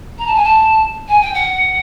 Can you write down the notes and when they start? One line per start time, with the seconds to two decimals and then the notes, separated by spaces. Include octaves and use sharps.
0.18 A#5
0.26 A5
0.35 G#5
0.43 A5
1.08 G#5
1.21 G5
1.34 F#5